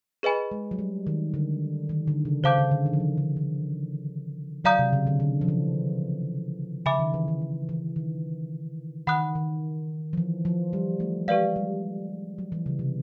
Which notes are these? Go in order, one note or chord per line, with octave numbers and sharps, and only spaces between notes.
G#4 B4 D#5 G#5 B5
G#3
F#3
G3
D#3
D3
D#3
D3
C#3
C#3 C5 F5 A5 D6 G6
C#3
D3
D#3
F3
E3
D3
D3
F#3 D5 F5 A#5 D#6 G6
C3
C#3
D3
D3
F3
E3
C#3 E5 G#5 B5 D6
D#3
E3
D#3
D#3
E3
D#3
D#3 F#5 B5 D#6 F#6
D#3
F3
E3
F3
G3
A3
G#3 G4 B4 D5 F5
G3
F#3
E3
C#3
C3